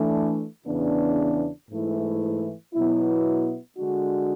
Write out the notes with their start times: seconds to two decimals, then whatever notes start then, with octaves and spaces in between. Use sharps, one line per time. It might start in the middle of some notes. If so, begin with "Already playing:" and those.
Already playing: E3 A3 D4
0.66 E2 C#3 E3 B3 D4
1.70 G#2 E3 A3 E4
2.74 B2 F#3 B3 E4
3.78 D3 G#3 D4 F#4